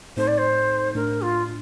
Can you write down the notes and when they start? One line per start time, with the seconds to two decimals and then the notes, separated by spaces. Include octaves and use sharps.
0.17 A2 A3 C4 D#4 A4 C5
0.28 D5
0.38 C5
0.95 A2 A3 D4 A#4
1.22 F4